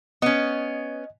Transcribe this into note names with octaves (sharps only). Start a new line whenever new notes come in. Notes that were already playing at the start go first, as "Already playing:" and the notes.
B3 C#4 D#5